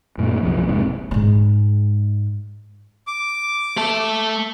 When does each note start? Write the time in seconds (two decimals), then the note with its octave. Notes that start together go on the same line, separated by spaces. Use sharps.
0.18 F#2 A#2 A3
0.42 C2 F#2 F3
0.68 F1 G#2 C3
1.11 G#2 G#3
3.07 D6
3.77 A3 A4